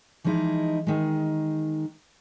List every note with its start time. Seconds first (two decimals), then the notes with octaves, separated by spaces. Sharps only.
0.24 E3 F3 G#3 D#4 E4
0.87 D#3 G#3